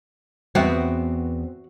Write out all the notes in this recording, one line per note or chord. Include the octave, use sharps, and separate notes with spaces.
E2 B3 C4 F#4 E5